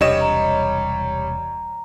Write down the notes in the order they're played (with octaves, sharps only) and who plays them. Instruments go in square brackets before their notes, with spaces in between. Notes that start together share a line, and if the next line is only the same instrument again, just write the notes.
[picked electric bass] E1 C2 [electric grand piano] G3 C#5 E7 [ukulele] D4 D#5
[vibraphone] A#5